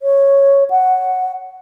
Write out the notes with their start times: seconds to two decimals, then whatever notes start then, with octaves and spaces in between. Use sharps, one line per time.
0.02 C#5
0.70 F#5